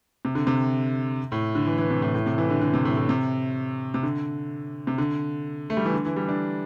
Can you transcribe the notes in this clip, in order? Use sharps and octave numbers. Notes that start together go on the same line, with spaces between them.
C3
D3
C3
A2
D3
E3
E3
C3
A2
A2
C3
E3
D3
D3
C3
A2
A2
C3
C3
D3
C3
D3
A3
G3
E3
D3
E3
G3
D4